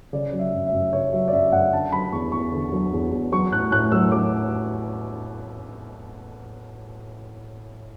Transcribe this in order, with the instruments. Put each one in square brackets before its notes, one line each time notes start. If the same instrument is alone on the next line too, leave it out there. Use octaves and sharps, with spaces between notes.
[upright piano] C#3 D5
F#3
E5
F#2
E5
F#2
C#3 C#5
F#3 E5
D5
F#2 E5
F#2 F#5
D3 A5
F#3 B5
E2 C#6
E2 C#6
D3
F#3
E2
E2
F#3 C#6
A2 F#6
A2 F#6
F#3 E6
F#3 D6